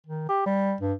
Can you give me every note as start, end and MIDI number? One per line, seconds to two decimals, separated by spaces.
0.06 0.28 51
0.29 0.45 67
0.46 0.74 55
0.81 0.93 43